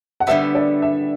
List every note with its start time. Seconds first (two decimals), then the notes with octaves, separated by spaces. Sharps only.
0.20 F#5
0.27 D3 G3 B3 E5
0.55 D5
0.82 E5